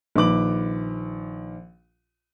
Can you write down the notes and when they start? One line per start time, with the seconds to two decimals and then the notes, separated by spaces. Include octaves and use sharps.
0.16 A#1 D#3 B4 D6 F#7